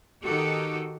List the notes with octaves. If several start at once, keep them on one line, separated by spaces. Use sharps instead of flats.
D#3 D#4 F#4 G4 A4